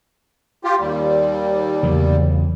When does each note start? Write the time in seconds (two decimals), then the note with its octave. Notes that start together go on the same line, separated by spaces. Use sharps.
0.64 F4 G4
0.79 D#2 G3
1.83 E2 C#3 F#3